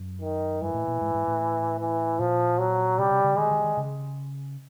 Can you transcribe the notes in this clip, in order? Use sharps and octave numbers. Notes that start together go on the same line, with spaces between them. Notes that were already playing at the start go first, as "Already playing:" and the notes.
Already playing: F#2
D#3
G2 E3
A2
A#2
G#2
G#2
A2
E3
A#2 F3
F#3
C3 G3
C3
C#3
D#3 G#3
D#3
D#3
C#3